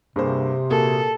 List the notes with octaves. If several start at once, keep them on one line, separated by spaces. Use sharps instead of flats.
G2 C3 A#3 C4 G#4 C5
A#2 A#3 F#4 G#4 A4